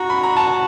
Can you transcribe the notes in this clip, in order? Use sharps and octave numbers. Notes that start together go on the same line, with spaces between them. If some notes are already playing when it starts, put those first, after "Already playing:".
Already playing: F#4 A#5
B5
A#5
A5